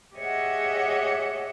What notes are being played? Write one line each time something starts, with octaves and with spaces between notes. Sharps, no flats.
G4 G#4 C#5 D#5 E5 F#5